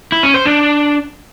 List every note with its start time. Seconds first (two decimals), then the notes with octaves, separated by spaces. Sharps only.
0.12 E4
0.23 C#4
0.34 C5
0.45 D4